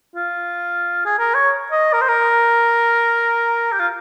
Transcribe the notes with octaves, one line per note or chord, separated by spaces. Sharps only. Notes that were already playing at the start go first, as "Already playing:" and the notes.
F4
G#4
A#4
C#5
D#5
A#4
C5
A#4
G4
F4